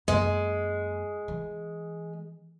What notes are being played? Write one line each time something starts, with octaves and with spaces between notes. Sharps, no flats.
F#2 G#3 A#3
E3